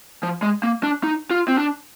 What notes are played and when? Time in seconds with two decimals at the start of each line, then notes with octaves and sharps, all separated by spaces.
0.23 F3
0.42 G#3
0.63 A#3
0.83 D4
1.04 D#4
1.31 F4
1.48 C4
1.58 D4